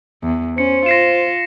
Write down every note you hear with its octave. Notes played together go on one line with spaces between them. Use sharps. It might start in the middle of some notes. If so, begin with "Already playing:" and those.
E2
C#4 C5 C#7
F4 A#6 C7 E7